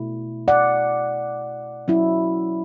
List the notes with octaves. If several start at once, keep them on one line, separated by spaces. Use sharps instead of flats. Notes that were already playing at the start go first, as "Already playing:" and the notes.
Already playing: B2 A3 E4
D5 F#5
F#3 C#4 E4